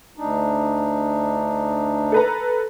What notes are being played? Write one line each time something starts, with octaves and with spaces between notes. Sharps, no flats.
D2 D4 D#4
A4 B4 A#5